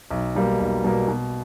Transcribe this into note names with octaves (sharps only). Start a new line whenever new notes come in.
B1
B2 G3 A#3
B1
B2 G3 A#3
B2